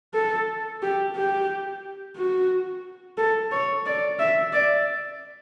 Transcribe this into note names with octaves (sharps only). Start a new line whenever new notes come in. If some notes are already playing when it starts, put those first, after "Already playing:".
A4
G4
G4
F#4
A4
C#5
D5
E5
D5